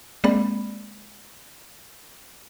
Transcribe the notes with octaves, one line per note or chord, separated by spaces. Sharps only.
G#3 A#3 C4 D5 B5